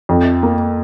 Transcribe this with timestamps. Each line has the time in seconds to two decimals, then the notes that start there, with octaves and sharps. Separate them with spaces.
0.09 F2
0.43 A#3